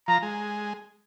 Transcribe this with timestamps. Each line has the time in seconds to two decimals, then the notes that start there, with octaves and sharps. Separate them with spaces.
0.08 F3 A#5
0.23 G#3